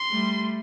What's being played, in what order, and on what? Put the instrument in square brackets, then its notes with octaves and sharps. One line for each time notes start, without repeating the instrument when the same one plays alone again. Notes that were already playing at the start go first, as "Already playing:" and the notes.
Already playing: [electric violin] C6
[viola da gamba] G3 A3